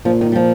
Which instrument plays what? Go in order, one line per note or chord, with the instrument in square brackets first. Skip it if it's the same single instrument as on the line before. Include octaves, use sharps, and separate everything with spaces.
[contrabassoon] A#2 [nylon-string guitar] F3
[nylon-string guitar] D#3
G3
F3